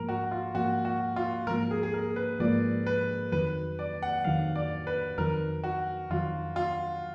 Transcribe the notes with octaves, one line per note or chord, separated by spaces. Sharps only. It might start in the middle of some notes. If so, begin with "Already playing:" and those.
Already playing: G#2 F3 A#3 A#4
F#4
F4
G#2 F3 A#3 F#4
F#4
F4
G#2 F3 A#3 A#4
G#4
G#4
A#4
B4
G#2 F3 A#3 D5
B4
F2 D#3 F#3 B4
D5
F#5
F2 D#3 F#3 F5
D5
B4
F2 D#3 F#3 A#4
F#4
F2 D#3 F#3 F4
F4